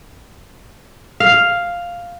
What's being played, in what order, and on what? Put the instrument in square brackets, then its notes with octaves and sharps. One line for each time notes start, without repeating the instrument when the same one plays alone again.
[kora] F5